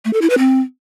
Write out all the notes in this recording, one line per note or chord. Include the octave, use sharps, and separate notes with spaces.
A3
A4
E4
B4
C4